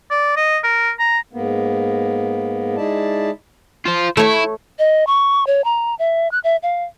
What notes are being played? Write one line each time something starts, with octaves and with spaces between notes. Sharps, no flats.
D5
D#5
A#4
A#5
G#2 A#3 B3
G#3 D#4 E4 D5 A5
F4 C5
A3 E4 C#5
D#5
C#6
C#5
A#5
E5
F#6
E5
F5